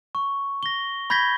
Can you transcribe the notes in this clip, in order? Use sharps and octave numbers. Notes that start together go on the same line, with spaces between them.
C#6
A#6 G7
B5 G6 G#6 A#6 B6 G7